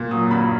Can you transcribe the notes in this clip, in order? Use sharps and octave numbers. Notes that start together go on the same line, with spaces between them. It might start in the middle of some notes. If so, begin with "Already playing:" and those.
Already playing: A#2
F#3 D#6
G2 B5